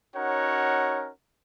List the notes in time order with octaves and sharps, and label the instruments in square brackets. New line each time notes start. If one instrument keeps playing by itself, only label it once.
[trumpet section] C#4 D#4 F#4 A#4 C#5 F#5